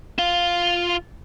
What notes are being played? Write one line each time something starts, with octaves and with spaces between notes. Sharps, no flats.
F4 F5